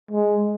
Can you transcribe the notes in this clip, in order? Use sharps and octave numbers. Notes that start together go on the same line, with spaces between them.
G#3